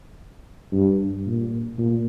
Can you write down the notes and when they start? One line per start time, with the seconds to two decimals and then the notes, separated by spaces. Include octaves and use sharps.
0.73 G2
1.27 A#2
1.78 A#2